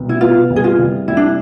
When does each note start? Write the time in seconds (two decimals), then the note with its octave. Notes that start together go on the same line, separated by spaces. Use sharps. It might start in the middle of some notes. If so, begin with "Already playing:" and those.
Already playing: C2 B2
0.09 E4
0.21 B3 F4
0.50 C2
0.56 G#4
0.64 F4
0.79 C2
1.08 C2 E4
1.17 D4